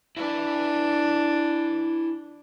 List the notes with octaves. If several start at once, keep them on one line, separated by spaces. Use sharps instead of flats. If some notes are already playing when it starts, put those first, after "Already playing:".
D4 E4 B4